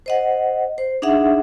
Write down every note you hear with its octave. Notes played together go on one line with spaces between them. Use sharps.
C5 D#5 F#5
C5
D4 D#4 G#4 E5 F#5